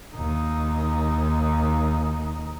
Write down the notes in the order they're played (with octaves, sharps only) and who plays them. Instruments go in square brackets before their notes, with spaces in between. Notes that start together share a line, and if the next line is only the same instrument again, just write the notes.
[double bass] D#2 D#4